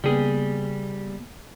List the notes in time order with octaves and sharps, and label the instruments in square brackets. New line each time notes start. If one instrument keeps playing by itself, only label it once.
[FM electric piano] C#3 A#3 B3 [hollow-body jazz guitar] G3 G#4